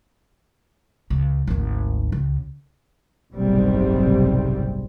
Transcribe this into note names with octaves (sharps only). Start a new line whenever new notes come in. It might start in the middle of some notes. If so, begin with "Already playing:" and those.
C#2
G#1 D2
C#2
F#1 B1 G#2 C3 G3 C4